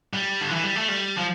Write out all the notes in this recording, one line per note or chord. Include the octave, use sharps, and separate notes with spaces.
G3
D3
E3
G3
A3
G3
F3